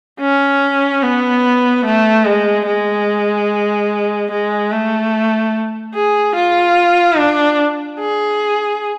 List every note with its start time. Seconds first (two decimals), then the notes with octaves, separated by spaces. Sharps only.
0.20 C#4
1.02 B3
1.85 A3
2.26 G#3
2.67 G#3
4.31 G#3
4.72 A3
5.95 G#4
6.35 F4
7.17 D4
7.99 G#4